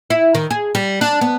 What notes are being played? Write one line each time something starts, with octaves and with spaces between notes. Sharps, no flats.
E4
D#3
G#4
G3
D4
B3